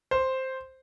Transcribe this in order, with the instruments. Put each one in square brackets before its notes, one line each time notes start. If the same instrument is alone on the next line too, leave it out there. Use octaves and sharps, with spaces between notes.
[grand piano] C5